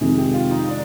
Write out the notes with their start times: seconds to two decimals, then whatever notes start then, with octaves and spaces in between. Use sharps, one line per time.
0.01 F2 C3 D#3 G#3 G#4
0.18 G4
0.34 F4
0.51 D#4
0.69 D4